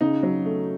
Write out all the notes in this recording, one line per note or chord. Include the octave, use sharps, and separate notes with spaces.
C#3 D#4
F#3
A3